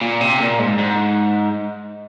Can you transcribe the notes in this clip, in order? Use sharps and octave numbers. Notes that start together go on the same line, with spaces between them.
A#2
C3
A#2
G#2
G#2